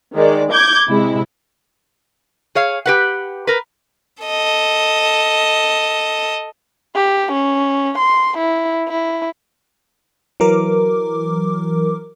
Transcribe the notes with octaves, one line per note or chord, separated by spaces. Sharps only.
D#3 G#3 D5
D6 G6 G#6
C3 G#3 E4
G#4 C#5 F5
G4 B4 F#5
A#4 B4
A4 D#5
G4
C#4
C6
E4
E4
E3 F#3 A#4 D6